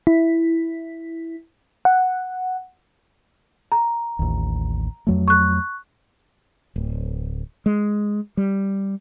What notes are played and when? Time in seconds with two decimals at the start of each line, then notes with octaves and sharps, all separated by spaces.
0.07 E4
1.85 F#5
3.72 A#5
4.19 A1 D#2
5.07 F2 F#3 A3
5.28 C#6 F#6
6.76 D1
7.66 G#3
8.37 G3